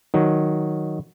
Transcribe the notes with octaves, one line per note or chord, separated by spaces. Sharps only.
D#3 F#3